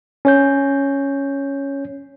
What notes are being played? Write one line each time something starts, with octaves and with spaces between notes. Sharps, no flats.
C#4 C#5 G6